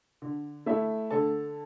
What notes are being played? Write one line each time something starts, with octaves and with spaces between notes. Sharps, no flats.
D3
A3 E4 E5
D3 A4 A5